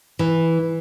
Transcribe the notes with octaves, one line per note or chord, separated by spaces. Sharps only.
E3